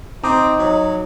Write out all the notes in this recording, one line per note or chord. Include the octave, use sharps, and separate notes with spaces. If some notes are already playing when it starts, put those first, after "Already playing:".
C4 D#4 A#5 D6 D#6
F#3